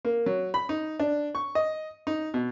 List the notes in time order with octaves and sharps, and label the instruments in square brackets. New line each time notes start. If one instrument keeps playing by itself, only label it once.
[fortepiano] A#3
F#3
B5
D#4
D4
C#6
D#5
D#4
B2